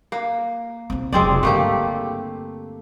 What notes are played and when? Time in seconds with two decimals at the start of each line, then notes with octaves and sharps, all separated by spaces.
0.12 A#3
0.90 B1 C4
1.12 F1 F#3 G#3 C4 D5
1.43 G2 D3 A3 A#3 G4